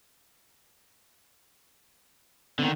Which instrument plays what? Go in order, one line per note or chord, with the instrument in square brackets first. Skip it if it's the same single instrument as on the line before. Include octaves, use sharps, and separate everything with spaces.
[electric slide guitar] D3 D#3 [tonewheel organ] B3 C4